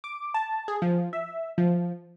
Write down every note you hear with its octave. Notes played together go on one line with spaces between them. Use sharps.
D6
A5
G#4
F3
E5
F3